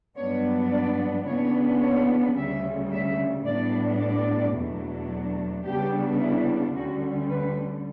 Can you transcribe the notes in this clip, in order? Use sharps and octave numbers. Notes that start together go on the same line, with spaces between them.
G2 F#3 B3 D4 C#5
D5
C#3 E3 B3 D4 C#5
C#5
D2 C#3 G3 C#4 E5
E5
A2 G3 B3 D4 D5
D5
E2 B2 F#3 A3 D4
C#3 G3 B3 D4 G4
E4
D2 D3 G3 C#4 F#4
B4